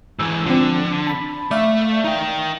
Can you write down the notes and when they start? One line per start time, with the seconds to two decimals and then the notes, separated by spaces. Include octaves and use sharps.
0.19 G#2 E3 E6
0.46 D3 F3 C4
1.07 A5 B5
1.51 A3 D5 E5 F5
2.04 D#4 G5